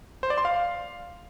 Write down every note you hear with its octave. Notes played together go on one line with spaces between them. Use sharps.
C5
D5
C6
F5